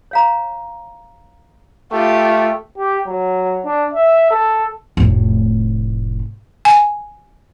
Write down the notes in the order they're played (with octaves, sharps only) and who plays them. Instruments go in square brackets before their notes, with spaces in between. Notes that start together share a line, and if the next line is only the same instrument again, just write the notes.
[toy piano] C#5 F5 A#5
[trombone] A3 [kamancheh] F4 G4
[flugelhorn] G4
F#3
D4
E5
A4
[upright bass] F1 A2
[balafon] G#5